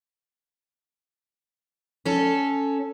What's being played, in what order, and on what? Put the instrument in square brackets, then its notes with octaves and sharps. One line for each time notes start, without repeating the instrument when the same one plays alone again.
[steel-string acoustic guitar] C#4 A4